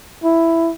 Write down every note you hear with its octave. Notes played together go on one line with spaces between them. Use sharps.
E4